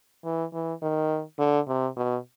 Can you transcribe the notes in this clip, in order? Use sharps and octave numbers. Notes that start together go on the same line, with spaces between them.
E3
E3
D#3
D3
C3
B2